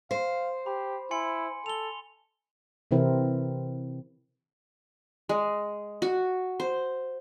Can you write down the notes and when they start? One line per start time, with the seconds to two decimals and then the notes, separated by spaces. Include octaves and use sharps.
0.11 C5 F5
0.66 G4 B5
1.11 E4 G#5 C6 C#7
1.66 A4 F7 G7
2.91 C3 E3 C4 E4 A#4
5.29 G#3
6.02 F#4
6.60 C5